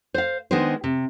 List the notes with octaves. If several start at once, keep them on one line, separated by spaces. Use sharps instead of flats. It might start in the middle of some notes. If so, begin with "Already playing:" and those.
C5 F5
D#3 G#3 B3 D4 C5
C3